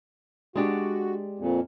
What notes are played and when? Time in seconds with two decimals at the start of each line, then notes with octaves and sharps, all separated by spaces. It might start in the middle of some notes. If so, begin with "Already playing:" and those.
0.55 G#3 D4 F#4 G4
1.39 F2 A#2